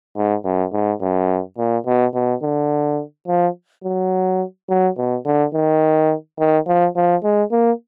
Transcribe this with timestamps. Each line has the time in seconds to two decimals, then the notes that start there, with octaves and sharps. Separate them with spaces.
0.16 G#2
0.45 F#2
0.73 G#2
1.01 F#2
1.58 A#2
1.86 B2
2.15 B2
2.43 D3
3.28 F3
3.84 F#3
4.69 F#3
4.97 B2
5.25 D3
5.54 D#3
6.39 D#3
6.67 F3
6.96 F3
7.24 G#3
7.52 A#3